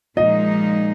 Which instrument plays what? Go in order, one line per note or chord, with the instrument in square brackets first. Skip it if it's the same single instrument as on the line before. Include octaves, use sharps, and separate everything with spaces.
[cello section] A#2 F3 G#3 D#4 [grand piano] D#5